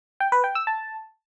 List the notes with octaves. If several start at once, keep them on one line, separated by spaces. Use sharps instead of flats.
G5
B4
G5
E6
A5